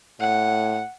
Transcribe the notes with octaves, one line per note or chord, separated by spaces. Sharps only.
A2 F#5